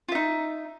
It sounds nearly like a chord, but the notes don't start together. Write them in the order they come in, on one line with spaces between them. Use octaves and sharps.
F4 E5 D#4